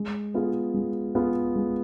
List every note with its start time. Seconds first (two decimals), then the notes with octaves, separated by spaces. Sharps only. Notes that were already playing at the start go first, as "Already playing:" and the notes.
Already playing: G#3
0.34 B3 F4 G#4
0.74 G#3
1.15 B3 F4 G#4
1.56 G#3